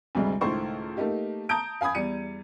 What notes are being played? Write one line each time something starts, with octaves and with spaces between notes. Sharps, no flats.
D2 G2 C3 G3 G#3
C#2 A2 D#3 A3 C5 C#6
A3 A#3 D#4 G4
A5 A#5 D#6 G6 D7
F5 G#5 B5 D#6 G#6
E2 G3 D5 C#7 D#7